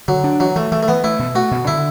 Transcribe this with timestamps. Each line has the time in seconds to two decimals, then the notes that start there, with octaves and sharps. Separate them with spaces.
0.08 D3 F#3
0.24 D4
0.40 E3 F#3
0.56 E3 A3
0.72 E3 A3
0.83 A3
0.88 E3 B3
1.04 A3 E4
1.19 B2
1.35 A3 F#4
1.51 B2
1.67 D3 E4